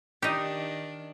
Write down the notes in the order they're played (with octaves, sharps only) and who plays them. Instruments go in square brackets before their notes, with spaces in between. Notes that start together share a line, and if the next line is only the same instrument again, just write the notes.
[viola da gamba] D#3 D4 [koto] D#4 G4